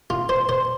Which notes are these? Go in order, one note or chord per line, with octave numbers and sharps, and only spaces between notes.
F4
C5
C5